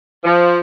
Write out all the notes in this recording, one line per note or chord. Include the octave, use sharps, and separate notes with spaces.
F3